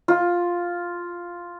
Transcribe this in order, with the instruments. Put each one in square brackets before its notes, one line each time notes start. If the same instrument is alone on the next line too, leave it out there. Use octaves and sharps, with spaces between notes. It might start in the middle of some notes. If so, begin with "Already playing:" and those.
[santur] F4